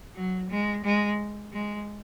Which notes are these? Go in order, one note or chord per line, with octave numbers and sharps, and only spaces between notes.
F#3
G#3
G#3
G#3